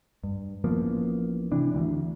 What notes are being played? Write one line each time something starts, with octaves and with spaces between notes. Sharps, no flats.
G2
A1 F3 A#3 B3
C3 E3 D4
D2 D#3 E3